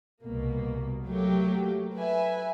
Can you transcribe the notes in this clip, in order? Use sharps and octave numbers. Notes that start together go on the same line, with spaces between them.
C2 B2 A#3
F#3 A3 A#3 G4
B4 E5 G#5